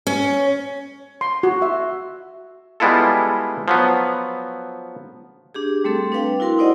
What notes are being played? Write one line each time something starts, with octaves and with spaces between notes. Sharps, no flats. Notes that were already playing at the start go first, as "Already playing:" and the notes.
C#4
C6
F#4
E5
G3 G#3 B3 E4 F4 A4
F3 F#3 B3
D4 G4 G#4
G3 A3 C4 A4
D4 B4 F5 G5
E4 F#4 A#4 C6
D#4 E4 C5 D5 D#5 F#5